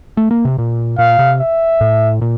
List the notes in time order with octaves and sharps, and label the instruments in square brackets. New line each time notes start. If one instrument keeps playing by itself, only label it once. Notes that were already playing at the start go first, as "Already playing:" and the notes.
[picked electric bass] A3
A#3
C3
A#2
[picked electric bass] A#2 [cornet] F5
[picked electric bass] C3
[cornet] E5
[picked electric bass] A2
A#2